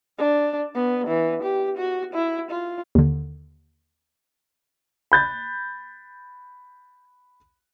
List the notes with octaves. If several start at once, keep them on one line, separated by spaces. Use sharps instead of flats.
D4
B3
E3
G4
F#4
E4
F4
D#2 D3
B5 G6 A6